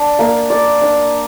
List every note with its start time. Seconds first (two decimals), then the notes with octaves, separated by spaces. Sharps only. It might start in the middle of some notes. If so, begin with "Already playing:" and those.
Already playing: D4
0.19 A#3
0.50 D5
0.82 D4